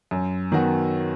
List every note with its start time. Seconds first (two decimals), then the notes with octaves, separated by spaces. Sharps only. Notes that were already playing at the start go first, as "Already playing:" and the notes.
0.11 F#2
0.52 D#3 F#3 B3 F#4